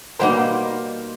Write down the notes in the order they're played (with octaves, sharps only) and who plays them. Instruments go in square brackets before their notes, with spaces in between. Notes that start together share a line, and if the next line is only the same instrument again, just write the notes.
[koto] B2 G3 A#3 D#4 [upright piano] A#4 C5